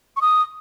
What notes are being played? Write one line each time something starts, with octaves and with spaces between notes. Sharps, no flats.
C#6
D#6